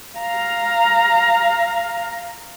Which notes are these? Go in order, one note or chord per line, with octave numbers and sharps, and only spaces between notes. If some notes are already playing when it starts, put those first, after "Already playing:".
F5 A#5